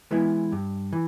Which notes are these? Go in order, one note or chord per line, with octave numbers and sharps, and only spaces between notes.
E3 G#3 B3 E4
G2
E3